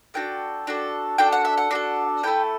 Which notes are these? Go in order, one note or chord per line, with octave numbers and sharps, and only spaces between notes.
D4 F#4 A4 G5
D4 F#4 A4
D4 F#4 A4 G5
F#5
E5
F#5
D4 F#4 A4
A3 E4 A4 G5